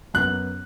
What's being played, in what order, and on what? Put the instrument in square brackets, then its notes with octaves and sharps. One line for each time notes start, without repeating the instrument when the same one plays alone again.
[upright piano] F#2 F#3 B3 [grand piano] F#6